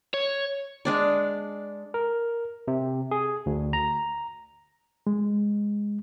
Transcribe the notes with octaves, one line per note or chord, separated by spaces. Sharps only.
C#5
G#3 D4 D5
A#4
C3
G#4
D2
A#5
G#3